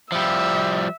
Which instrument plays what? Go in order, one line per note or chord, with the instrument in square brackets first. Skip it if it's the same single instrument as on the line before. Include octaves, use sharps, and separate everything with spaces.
[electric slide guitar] F3 G3 [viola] E5